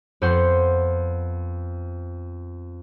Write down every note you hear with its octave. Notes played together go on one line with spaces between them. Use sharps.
F2 B3 C5 F#5 C6